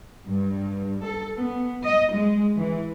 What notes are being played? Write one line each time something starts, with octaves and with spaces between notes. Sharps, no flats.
G2
A4
B3
D#5
G#3
E3